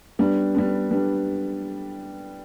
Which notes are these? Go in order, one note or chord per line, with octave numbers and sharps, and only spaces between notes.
G3 B3 D4
G3 B3 D4
G3 B3 D4